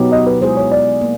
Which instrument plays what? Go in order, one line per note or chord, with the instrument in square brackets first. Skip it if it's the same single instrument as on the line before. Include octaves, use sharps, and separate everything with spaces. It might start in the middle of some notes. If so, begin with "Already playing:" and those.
Already playing: [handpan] B2 F#3 B3 D#4 G4
[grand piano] D#5
B4
[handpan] G#3 B3 E4 G#4 [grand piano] C5
[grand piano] C#5
D5
[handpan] A#3